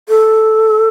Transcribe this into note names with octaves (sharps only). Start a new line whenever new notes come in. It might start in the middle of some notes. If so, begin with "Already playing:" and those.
A4